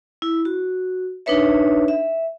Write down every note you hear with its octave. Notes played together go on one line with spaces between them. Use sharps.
E4
F#4
D4 D#4 B4 C#5 E5
E5